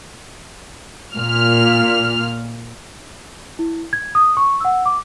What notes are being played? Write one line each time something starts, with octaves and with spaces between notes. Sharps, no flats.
A#2 F6
E4
G#6
D#6
C#6
F#5 E6
D6